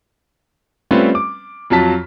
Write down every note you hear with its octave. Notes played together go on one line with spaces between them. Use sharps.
G3 A3 C4 C#4 F4 B4
D6
F2 F#3 F4 A5 B6